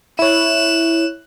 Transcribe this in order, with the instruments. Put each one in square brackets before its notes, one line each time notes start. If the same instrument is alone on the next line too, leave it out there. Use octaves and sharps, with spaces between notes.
[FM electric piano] E4 C#5 [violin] F#6 E7